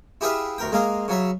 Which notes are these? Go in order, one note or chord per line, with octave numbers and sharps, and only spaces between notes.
E4 G4 G#4 B4 E5 F5
D2 A#4 G5
G#3 A#3 G#4 F5
C#3 F#3 E5